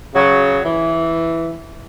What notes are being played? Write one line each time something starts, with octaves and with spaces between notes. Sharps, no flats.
C#3 F#3
E3